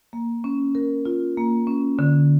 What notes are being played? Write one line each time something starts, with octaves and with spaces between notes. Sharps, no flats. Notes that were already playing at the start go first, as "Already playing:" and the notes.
A#3
C#4
A#4
F4
A#3
C#4
D3